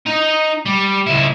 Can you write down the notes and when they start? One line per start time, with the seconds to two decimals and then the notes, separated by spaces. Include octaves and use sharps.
0.06 D#4 D#5
0.66 G3
1.07 C#2 E4